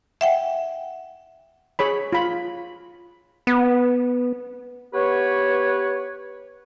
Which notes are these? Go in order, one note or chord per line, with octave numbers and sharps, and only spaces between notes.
E5 F#5 G5
G#4 C#5 B5
F4 B5
B3
B3 G4 B4 C#5